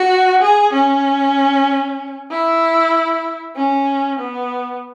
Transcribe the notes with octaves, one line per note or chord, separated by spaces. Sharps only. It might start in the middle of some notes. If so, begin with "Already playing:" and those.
Already playing: F#4
G#4
C#4
E4
C#4
B3